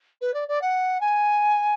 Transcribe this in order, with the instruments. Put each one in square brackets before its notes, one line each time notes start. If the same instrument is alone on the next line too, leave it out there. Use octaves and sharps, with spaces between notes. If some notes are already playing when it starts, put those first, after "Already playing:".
[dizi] B4
D5
D5
F#5
G#5